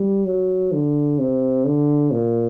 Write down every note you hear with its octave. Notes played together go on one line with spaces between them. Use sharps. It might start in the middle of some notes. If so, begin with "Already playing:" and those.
Already playing: G3
F#3
D3
C3
D3
A#2